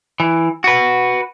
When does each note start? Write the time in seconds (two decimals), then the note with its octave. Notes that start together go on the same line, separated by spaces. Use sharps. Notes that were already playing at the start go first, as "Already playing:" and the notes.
0.20 E3
0.64 F#4 B4